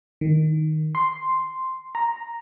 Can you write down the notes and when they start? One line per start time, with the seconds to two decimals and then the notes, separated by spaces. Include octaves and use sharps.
0.21 D#3
0.95 C6
1.95 A#5